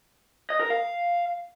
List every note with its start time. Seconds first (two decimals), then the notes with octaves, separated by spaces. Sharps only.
0.50 D#5
0.60 A#4
0.70 F5